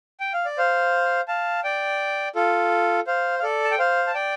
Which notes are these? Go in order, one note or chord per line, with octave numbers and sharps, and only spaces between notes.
G5
F5
D5
C5 F5
F5 A5
D5 G5
F4 A4
C5 F5
F5
A4 D5
A5
G5
C5 F5
A5
D5 G5